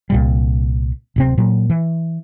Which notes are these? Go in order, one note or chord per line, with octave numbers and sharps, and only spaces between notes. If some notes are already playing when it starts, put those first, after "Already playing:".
C2 A#2 G3
D1 C3 C4
A#2 F#3
E3